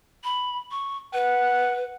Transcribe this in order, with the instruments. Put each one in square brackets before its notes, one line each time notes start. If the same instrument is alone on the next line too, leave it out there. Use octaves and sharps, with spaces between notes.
[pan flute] B5
C#6
[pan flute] B4 [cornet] F#5